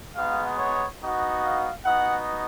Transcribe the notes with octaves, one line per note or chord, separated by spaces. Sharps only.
G#3 B3 D#4 F#4 F5
C#5
B3 D#4 F#4
F5
B3 D#4 F#4 F#5